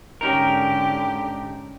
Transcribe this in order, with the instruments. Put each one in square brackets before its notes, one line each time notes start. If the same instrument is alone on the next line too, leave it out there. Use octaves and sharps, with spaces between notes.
[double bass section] G#2 D3 [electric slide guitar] C#4 D#4 A#4 [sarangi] G4